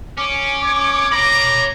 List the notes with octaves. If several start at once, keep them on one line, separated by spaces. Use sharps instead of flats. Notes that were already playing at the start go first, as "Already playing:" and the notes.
C#4 D6
C#5
C#5 A#5 B5